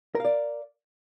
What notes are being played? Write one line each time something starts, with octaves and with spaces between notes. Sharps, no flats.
A#4 D5 F5